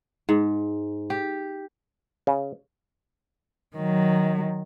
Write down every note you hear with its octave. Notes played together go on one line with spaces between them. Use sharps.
G#2
G4
C#3
D#3 F#3